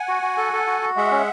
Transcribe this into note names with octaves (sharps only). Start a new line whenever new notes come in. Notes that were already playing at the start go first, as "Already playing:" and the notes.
Already playing: F#5 G#5
F#4
F#4
A4
A4
F#4
F#4
G#3 E5 F#5
C#4